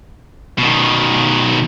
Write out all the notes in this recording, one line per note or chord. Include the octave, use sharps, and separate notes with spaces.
B2 D#3